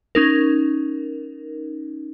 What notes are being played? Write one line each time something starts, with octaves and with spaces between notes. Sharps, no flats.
C#4 D#4 A#4